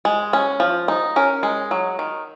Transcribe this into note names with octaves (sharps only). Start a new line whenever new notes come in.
G#3
C#4
F3
D#4
C#4 A#4
G#3
F#3
D#3